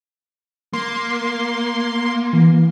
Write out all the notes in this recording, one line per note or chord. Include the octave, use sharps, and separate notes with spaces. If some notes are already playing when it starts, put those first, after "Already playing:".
A#3 C6
E3